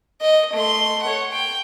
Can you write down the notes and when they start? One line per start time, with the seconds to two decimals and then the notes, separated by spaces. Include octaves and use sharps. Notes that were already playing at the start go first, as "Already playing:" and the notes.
0.21 D#5
0.53 A3 C6
1.02 C#5 F#5
1.31 G5